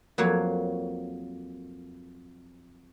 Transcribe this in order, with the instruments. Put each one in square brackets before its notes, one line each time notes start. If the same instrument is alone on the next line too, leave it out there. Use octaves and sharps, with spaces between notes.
[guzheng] F2 F#3 A#3 C#5